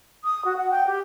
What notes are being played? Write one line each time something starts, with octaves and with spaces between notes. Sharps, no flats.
D#6
F#4
F#5
G5
G4